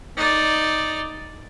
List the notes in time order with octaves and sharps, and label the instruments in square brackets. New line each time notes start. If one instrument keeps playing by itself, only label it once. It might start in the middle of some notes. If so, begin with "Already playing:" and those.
[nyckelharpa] D#4 D5